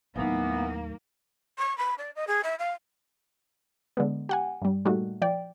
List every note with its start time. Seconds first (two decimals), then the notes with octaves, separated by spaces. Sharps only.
0.16 D#2 A2 E3 F#3 A#3 B3 D#4
1.58 C#6
1.78 B5
1.98 D5
2.16 D#5
2.27 G#4
2.43 E5
2.59 F5
3.97 D3 G#3 B3
4.29 G4 F#5 G#5
4.62 G2 G3
4.85 A#2 G3 A3 D#4 F#4
5.22 F3 D5 G5